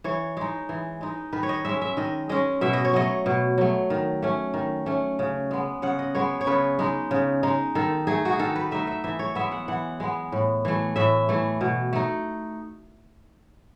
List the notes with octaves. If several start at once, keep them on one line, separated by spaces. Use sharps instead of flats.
E3 C#5
G#3 D#4
E3
G#3 D#4
D#3 B4
C#5
D#5
G#3 C#4 E5
E5
D#3 D#5
G#3 C#4 D#5
B2 E5
D#5
C#5
F#3 A3 D#5
B2
F#3 A3
D#3
A3 C#4
D#3
A3 C#4
C#3
G#3 B3
C#3 F#5
D#5
G#3 B3 C#5
C#5
C#3 B4
G#3 D#4
C#3
G#3 D#4
D#3 A4
A3 D#4 G#4
F#4
G#4
D#3 A4
B4
A3 D#4 E5
E5
E3 E5
C#5
G#3 B3 E5
F#5
E3 F#5
G#3 B3
A2
E3 A3
A2 E5
E3 A3
B2
A3 D#4